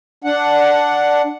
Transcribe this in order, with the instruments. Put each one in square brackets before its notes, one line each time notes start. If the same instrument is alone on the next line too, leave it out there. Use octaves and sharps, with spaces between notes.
[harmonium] D4 F#5